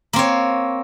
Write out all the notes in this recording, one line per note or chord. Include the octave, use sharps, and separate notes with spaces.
A#3 C4 C#5